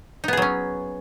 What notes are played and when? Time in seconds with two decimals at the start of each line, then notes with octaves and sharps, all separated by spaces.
0.24 D#4
0.28 B3
0.33 G#4
0.37 F#3
0.42 C#4